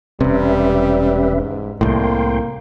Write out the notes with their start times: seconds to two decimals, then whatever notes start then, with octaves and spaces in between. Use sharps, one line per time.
0.21 E1 C3 G3 C#4 B4 E5
1.36 G#2
1.81 C2 A2 A#3 G5 C6